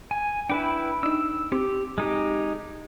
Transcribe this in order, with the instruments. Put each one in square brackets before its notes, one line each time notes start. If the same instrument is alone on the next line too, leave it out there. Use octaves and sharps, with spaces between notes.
[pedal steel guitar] G#5
[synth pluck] D4 [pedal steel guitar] E4 B4 G5
[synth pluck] D4 D#4 [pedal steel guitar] E6
[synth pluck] C4 [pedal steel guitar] G4
[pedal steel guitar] G#3 D#4 G4